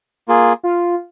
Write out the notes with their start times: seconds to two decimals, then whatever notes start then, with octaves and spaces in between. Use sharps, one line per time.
0.28 A#3 F4 G#4
0.63 F4